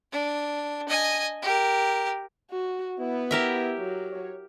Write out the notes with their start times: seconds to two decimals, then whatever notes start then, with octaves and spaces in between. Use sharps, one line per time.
0.12 D4
0.89 D#5 G#5
1.43 G4 A#4
2.51 F#4
2.98 B3 E4
3.31 E4 G4 A#4 E5
3.78 F#3
4.11 C#5